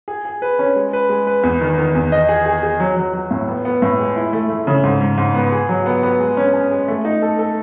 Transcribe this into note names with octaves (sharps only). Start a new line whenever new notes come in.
G#4
G#4
B4
C#4
G#3
B4
G#3
B4
E2
D#3
D#3
E2
D#5
G#4
G#4
G#4
F#3
F#3
F#3
A2
B3
B3
A2
G#3
E4
A3
A3
C#3
G#2
G#2
G#2
B3
G#4
F#3
B3
B3
G#3
C#4
C#4
G#3
A3
D#4
A4
A4